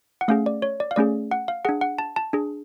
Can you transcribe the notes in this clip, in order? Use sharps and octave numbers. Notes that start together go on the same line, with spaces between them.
F#5
A3 C#4 G#4 F5
D5
C#5
D5
F5
A3 C#4 G#4 D5
F#5
F5
D4 G#4 F#5
F#5
A5
A5
D4 G#4